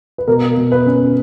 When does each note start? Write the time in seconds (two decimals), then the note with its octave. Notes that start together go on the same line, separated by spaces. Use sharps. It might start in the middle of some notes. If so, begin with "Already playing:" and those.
0.18 B4
0.27 B2 A#4
0.57 B2
0.72 B4
0.87 C#4